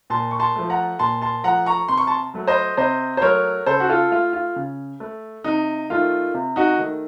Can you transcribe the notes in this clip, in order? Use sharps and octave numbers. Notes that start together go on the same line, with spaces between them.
A#2 A5 C6
C#6
A5 C6
F3 A3
F#5 A#5
A#2 A5 C6
A5 C6
F3 A3 F#5 A#5
A#5 C#6
C3 C6
C#6
A5 C6
F#3 A3
C5 D#5
C3 C5 D#5
C5
F#3 A3 A#4 C#5
C#3 A4 C5
F#4
F4 A4
A3 F4
F4
C#3
A3
C3 D#4
D#3 A3 F4
C3
D#4 F#4
D#3 A3